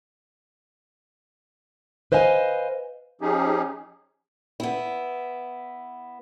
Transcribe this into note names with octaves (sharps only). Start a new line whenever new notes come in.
B4 C5 D#5 F5 G#5
F3 C#4 D#4 G4 G#4
B3 E4